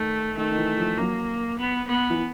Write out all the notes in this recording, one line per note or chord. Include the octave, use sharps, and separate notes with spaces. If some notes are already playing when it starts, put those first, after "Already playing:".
Already playing: D#3 A3
D#3 A3
D#3
E3
F3
F#3 A#3
B3
B3
E3